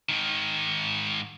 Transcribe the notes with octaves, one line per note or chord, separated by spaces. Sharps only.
G#2 D#3